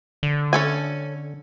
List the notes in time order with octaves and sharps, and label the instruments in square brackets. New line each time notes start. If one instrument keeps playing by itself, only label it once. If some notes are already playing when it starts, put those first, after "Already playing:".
[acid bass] D3
[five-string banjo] C#4 A4 G#5